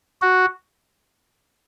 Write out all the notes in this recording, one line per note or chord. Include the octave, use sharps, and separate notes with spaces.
F#4